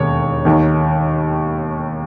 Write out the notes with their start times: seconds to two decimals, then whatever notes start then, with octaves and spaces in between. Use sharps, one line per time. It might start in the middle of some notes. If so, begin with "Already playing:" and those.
Already playing: E1 D#2 D#3 C#5
0.45 D#2 D#3